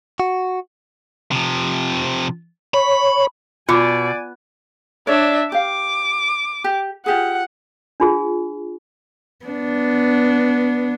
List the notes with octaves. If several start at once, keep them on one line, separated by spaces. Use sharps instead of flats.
F#4
C3 F3
C#5 B5
B2 F4 D5 G#5 D6
D4 C#5 D5 E5
G4 F5 D6
G4
F4 G4 G#4 F#5
D4 F4 G#4
B3 D4